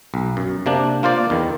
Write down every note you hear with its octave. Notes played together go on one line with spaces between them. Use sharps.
B1
F#2
C3 A#3 D4
A#3 F4 C5 D5
E2 D#3